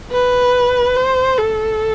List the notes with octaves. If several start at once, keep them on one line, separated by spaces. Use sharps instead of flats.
B4
C5
A4